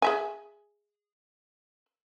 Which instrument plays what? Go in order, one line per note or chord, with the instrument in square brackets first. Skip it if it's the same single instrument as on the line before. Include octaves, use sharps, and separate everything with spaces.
[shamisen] G#4 E5 G#5